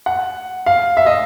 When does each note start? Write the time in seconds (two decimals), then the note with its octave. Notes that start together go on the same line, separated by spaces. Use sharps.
0.06 F#5
0.66 F5
0.97 E5
1.06 D#5